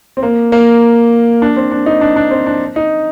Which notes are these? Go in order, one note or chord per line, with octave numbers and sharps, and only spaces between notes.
C4
A#3
A#3
D4
C4
D4
D#4
D4
D4
C4
D4
D#4